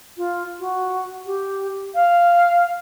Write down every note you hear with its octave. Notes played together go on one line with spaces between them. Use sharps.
F4
F#4
G4
F5